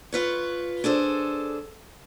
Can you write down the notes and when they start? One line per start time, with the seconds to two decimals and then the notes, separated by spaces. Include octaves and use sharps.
0.12 F4 B4 C#5
0.84 D4 G#4 A4 C5